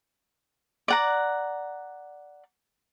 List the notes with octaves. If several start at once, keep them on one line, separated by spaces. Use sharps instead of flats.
D5 F#5 A#5